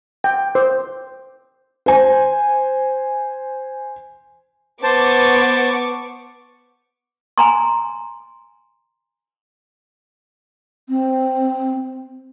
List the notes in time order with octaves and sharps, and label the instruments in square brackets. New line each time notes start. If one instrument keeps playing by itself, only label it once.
[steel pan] G5
C5
[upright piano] C5 G#5
[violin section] B3 C#6 D6 [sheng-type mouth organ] C5 A5
[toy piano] G#5 A#5 C6
[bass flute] C4